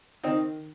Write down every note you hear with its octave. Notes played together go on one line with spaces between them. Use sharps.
D#3 C4 D#4